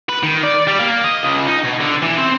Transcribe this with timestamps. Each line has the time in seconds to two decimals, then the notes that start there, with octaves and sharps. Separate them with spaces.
0.09 B4
0.23 D#3
0.43 D5
0.68 G3
0.79 A#3
1.04 D#5
1.23 C#2
1.48 D#4
1.65 B2
1.81 D3
2.02 E3
2.17 C4